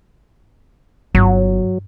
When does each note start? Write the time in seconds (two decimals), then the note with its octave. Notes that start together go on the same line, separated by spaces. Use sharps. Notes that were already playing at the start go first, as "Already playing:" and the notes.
1.15 G1 F#3